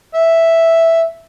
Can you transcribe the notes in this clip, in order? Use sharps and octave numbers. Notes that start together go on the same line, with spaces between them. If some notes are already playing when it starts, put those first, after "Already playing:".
E5